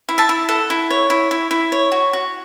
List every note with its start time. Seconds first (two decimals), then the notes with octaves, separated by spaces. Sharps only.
0.09 E4
0.18 E5 A5
0.29 E4
0.49 A4 F#5
0.70 E4
0.90 C#5
1.10 E4
1.31 E4
1.51 E4
1.72 C#5
1.92 F#4
2.13 F#4